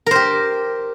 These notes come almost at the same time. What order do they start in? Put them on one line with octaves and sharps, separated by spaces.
A#4 C5 G4